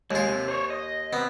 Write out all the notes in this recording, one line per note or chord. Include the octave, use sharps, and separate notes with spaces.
D#2 G#3 F4
C3
C5 C#5
D#5
C3 B3